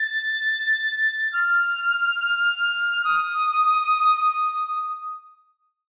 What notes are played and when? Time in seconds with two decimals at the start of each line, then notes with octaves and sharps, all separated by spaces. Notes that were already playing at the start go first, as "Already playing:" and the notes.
Already playing: A6
1.32 F6
3.04 D#6